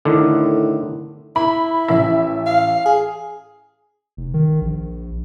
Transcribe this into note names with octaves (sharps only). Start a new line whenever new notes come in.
A2 D3 D#3
E4 B5
A1 E5
F5
G#4
F1
D#3
A#1